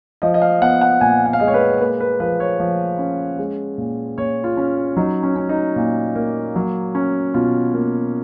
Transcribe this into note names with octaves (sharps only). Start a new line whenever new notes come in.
F3 D#5
D#5
F5
B3 F#5
F#5
A#2 G#5
F#5
F5
G#3 D#5
C#5
B4
A#3 B4
B4
F3 B4
C#5
F3
C#4
G#3
A#2
A#2 C#5
F4
C#4
F#3 D#4
C#4
C#4
D#4
A#2
A#3
F#3
C#4
B2 F4
A#3